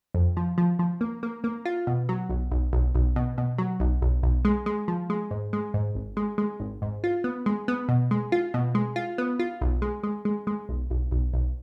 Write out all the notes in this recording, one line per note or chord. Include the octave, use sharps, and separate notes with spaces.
F2
F3
F3
F3
A#3
A#3
A#3
F4
B2
F#3
B1
B1
B1
B1
B2
B2
F#3
B1
B1
B1
G#3
G#3
F3
G#3
G#2
G#3
G#2
G#1
G#3
G#3
G#1
G#2
F4
B3
G#3
B3
B2
G#3
F4
B2
G#3
F4
B3
F4
B1
G#3
G#3
G#3
G#3
B1
B1
B1
B1